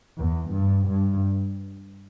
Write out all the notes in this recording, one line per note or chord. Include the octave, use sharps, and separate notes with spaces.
E2
G2
G2